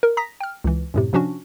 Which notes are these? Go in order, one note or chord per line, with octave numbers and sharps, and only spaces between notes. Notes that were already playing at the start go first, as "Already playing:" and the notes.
A#4
A#5 D#6 A#6 B6
G5 F6
C#2 E3
F#2 A2 C3
C3 F3 C#4 D4 F#4